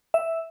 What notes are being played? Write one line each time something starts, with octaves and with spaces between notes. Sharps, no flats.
E5